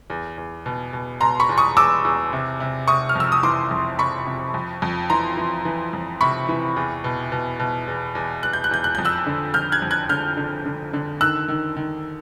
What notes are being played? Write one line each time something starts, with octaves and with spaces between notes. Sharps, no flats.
E2
E2
B2
B2
B2 A#5 C6
B5 C#6
E2
C#6 D#6
E2 D6 E6
E2
C3
C3
C3 C#6 D#6
F6
F2 E6
D#6
E3 C6 D6
F2
C3 B5 C#6
C3
F2
F2
E3 A#5 C6
E3
E3
F2
C3 B5 C#6
E3
E2
B2
B2
B2
E2
E2
E2 F#6
G6
F#6
E2 G6
F#6
F2 G6
E6 F#6
D3
F2 F6 G6
F#6 G#6
F2
F#6 G#6
D3 F6 G6
D3
D3
D3
D#3 E6 F#6
D#3
D#3